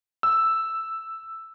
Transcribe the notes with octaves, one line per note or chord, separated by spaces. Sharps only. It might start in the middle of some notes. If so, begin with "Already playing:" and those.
E6